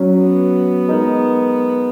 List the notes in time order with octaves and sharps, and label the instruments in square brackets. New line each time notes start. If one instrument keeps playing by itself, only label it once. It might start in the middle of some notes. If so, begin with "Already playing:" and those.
Already playing: [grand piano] F#3 C#4 F#4
[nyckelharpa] B3
[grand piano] G#3 D#4 A#4